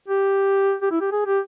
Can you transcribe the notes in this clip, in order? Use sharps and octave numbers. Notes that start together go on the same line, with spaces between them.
G4
G4
E4
G4
G#4
G4